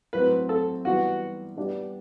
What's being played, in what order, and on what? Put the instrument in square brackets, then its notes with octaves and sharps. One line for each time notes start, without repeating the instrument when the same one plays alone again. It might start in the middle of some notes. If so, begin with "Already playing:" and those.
[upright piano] A2 F#3 C4 [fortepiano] B4
[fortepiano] A4
[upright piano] E3 G3 B3 [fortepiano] F#4
[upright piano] G3 B3 D4 G4 D5